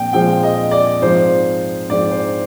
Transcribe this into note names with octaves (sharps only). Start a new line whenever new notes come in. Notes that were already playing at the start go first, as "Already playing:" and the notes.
Already playing: A#2 F3 C4 G5
A#2 F3 G#3 C4 G5
D#5
D5
G#2 F3 C4 C5
G#2 F3 C4 D5
C5